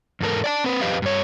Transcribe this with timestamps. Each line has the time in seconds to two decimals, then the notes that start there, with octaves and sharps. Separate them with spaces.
0.21 E2 G#2 A4 A#4
0.44 D5 G#5 A5
0.64 C4 B4
0.81 F2 G4 B4 D#5 F5
1.02 G2 C#5